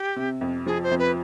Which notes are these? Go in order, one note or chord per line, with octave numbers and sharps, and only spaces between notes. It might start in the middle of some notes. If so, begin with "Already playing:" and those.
Already playing: G4
C3
F2
F3 G#4
C5
F2
B4